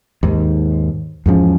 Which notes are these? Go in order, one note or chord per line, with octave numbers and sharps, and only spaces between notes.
D#2 G#2
E2 G#2 F3 C#4